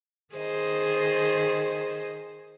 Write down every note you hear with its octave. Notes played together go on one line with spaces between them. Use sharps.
D#3 G#4 C5 D#5